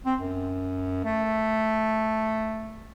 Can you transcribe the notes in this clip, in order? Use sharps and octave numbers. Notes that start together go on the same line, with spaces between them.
C4
F#2
A3